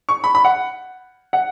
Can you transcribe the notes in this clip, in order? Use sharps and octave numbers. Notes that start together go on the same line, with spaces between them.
C#6
B5
B5
F#5
F#5